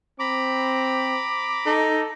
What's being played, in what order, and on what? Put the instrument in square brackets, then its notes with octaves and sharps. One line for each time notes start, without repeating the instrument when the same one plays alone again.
[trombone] C4 [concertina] A#5 B5 [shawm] D6
[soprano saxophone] D#4 [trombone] A4